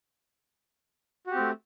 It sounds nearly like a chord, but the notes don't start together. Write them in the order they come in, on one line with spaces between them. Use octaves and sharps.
F#4 G4 C4 A3